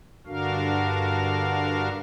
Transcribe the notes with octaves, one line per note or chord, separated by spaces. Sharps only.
G2 D3 D4 F#4 A#4 F5